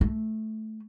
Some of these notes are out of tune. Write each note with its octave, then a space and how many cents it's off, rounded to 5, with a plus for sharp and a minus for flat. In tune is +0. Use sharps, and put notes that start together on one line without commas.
A3 -10